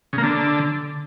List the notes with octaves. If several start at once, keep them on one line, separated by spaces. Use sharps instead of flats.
C#3
A#3
D3